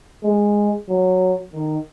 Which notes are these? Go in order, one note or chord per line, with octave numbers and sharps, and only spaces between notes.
G#3
F#3
D#3